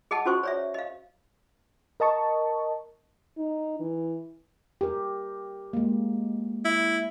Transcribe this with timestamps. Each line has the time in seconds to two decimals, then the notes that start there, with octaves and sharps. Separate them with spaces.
0.11 G#4 D#5 F#5 A5
0.26 C#4 F#4 C5 C#6
0.43 C#5 D5 E5
0.74 D#5 F5
2.00 A#4 D#5 A5 C#6
3.37 D#4
3.80 E3
4.81 G4 A#4
5.73 G#3 A#3
6.65 E4